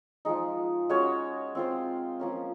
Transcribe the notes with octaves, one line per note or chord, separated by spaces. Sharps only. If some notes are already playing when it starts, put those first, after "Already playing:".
F3 G#3 D#4
G#3 C#4 F#4 C#5
C4 F4 C5
F3 A#3 C#4